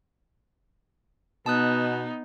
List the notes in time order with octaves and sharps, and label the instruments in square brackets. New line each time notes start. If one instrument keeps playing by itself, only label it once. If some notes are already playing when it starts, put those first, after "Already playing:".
[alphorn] B2 [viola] B3 D#4 [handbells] A5 D#6 F#6